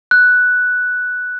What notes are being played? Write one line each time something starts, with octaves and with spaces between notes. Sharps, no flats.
F#6